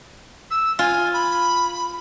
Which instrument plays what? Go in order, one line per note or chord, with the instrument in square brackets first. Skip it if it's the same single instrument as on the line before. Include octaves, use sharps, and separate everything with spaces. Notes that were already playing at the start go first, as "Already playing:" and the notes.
[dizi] E6
[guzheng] F4 [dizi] G#5
[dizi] B5